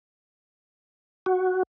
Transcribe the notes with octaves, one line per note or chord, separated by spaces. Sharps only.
F#4